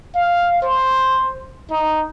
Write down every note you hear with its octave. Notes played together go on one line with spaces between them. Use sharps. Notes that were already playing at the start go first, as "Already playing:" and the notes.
F5
C5
D#4